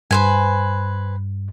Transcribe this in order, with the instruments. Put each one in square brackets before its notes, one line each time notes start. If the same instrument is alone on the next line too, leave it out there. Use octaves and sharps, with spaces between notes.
[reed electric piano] G2 [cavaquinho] B4 C5 G#5